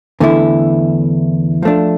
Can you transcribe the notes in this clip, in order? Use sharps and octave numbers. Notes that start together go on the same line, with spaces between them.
E2 D3 A3 E4
F3 A3 D4